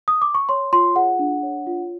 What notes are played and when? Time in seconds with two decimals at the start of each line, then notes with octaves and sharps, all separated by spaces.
0.08 D#6
0.22 D6
0.35 C#6
0.49 C#5 C6
0.73 F4 C6
0.95 G#4 F#5
1.19 D4
1.43 C#5
1.67 F4